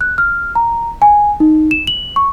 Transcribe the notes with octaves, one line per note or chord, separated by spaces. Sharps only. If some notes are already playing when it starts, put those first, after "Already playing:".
F#6
F6
A#5
G#5
D#4
E7
F#7
C#6